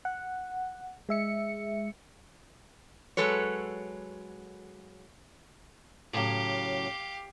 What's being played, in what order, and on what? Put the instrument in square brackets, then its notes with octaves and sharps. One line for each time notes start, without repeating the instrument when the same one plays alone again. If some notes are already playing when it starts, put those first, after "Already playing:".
[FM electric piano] F#5
G#3 E5 C#7
[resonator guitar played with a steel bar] F#3 G#3 A4 B4 C#5
[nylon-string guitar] A2 C#3 F#3 [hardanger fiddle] G4 F5